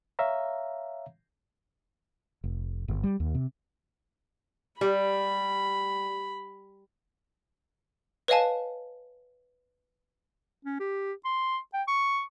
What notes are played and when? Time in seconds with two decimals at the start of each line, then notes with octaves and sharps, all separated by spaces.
0.19 C#5 E5 F5 A#5
2.44 F1
2.88 G1
3.04 G3
3.20 D#2
3.35 C3
4.81 G3 B5
8.28 B4 C#5 D#5 F5 G#5 A5
10.65 C#4
10.80 G4
11.25 C6
11.74 G5
11.88 C#6